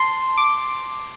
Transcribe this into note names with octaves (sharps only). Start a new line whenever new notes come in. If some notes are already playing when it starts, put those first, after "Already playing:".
Already playing: A5 C6
D6